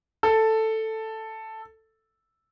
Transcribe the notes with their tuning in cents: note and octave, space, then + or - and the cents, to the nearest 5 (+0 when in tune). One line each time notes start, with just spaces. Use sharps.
A4 +5